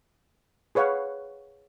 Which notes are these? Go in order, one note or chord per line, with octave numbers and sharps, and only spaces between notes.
G#4 B4 C#5 F5 F#5